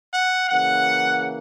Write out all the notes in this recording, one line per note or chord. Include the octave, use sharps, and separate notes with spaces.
F#5
C#3 E3 A#3 F#5